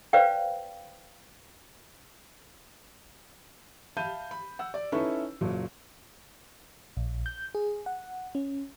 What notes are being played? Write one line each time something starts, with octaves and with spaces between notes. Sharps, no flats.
B4 C5 D5 F5 G5
E5 F5 A5 B5 G6 D#7
B5
F#5 E6
D5
C#4 D#4 E4 A4 B4 C#6
F#1 A#2 F#3
A#1
G6
G#4
F#5
C#4